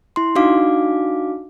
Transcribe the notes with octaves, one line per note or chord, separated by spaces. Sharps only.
E4 C6
D4 D#4 F#4 F5 D6